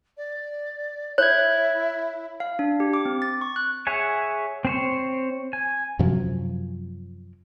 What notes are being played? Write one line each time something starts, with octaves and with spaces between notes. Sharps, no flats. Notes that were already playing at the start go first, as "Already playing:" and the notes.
D5
E4 C#5 F#6 G#6
F5
D4
G4
D6
C4
A6
C#6
F#6
G#4 C#5 E5 F#5 G#5
C4 C5 C#5
G#5
F#2 C3 F3 F#3